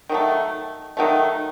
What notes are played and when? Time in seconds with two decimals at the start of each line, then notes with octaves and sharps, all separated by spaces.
0.09 D#3 F#3 A3
0.97 D#3 F#3 A3